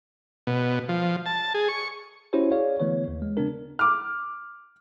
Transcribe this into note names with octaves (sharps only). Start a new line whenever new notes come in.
B2
F3
A5
G#4
C#6
C#4 E4 F#4 G4 C5 C#5
G#4 C#5 D5 F5
D3 E3 A3 B3 C#5
D#2
G#3
C#3 B3 C4 D4 A#4
D6 F6